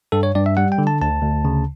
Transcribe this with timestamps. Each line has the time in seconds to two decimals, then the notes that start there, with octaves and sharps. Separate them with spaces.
0.12 G2 A4
0.23 C#5
0.35 G2 D5
0.46 E5
0.57 G3 F#5
0.72 G5
0.78 D3
0.87 A5
1.02 D2 A5
1.23 D2
1.45 C#3